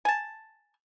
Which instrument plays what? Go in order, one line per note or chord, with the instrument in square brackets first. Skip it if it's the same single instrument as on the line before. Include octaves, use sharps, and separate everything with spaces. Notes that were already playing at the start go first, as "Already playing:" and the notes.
[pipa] G#5 A5